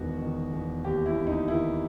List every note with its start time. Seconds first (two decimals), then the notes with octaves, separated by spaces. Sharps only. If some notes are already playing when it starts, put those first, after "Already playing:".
Already playing: E1 D#3 F#4
0.21 D#3
0.53 E1
0.84 D#2 G4
1.06 E4
1.16 D#2
1.27 D#4
1.48 D#3 E4